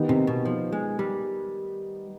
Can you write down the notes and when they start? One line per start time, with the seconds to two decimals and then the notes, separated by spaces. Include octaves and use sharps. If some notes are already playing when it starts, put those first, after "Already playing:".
Already playing: D#3 B3 D#4 G4
0.09 C3
0.27 B2
0.45 F3
0.72 G#3
0.99 G3